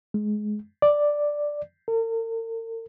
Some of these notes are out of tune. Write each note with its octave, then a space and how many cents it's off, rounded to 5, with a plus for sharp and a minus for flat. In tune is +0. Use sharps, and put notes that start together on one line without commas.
G#3 +20
D5 +0
A#4 -45